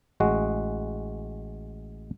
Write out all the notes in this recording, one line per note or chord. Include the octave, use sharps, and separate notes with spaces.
A1 G#3 F#4